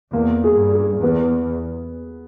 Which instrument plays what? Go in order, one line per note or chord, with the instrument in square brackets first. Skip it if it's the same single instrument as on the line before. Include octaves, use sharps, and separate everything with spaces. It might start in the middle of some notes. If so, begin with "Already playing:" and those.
[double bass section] E2 [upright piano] A#3
[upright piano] G#4
[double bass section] G2
[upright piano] G#4
[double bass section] E2 [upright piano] B3